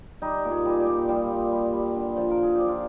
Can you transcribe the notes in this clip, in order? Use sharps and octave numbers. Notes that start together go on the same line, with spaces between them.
G3 D#4
A#2
G#4
G3
G#4
G4
A#2
G3 F4
A#2
G3
G3
D3
F3
A#4
D3
G#4
G4
F3
F4